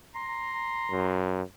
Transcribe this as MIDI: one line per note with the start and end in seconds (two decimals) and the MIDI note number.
0.15 1.28 82
0.15 1.28 84
0.91 1.42 42